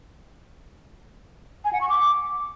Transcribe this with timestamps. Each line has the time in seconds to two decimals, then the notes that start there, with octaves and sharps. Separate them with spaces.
1.65 G#5
1.73 F#5
1.81 C#6
1.89 D6